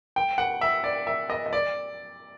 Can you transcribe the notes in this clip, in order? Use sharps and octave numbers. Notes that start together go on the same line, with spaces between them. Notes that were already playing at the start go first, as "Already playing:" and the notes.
G5
F#5
E5
D5
E5
D#5
D#5
D5